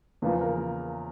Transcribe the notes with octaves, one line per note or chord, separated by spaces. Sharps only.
E2 C#3 F3 A#3 B4
A#4